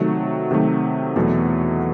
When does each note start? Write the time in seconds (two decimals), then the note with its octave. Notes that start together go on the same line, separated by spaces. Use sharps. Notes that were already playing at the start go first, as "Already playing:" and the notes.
Already playing: C3 D#3 F#3 A3
0.51 C3 D#3 F#3 A3
1.16 E2 B2 F#3 A3